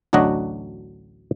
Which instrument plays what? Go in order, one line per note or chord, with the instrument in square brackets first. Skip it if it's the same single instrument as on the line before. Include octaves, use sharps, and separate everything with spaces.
[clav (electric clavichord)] A1 D2 F#3 D4 F#4 D#5